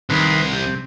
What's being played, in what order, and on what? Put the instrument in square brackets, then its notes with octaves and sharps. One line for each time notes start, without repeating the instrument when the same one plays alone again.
[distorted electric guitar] C2 [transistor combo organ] D#3 B4 C6
[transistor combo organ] C3